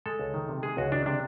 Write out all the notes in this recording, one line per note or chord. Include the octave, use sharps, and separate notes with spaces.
G#3 A4
C#2
D#3
C3
G#3 G#4
C#2 F#4
D#3 D4
C3 D4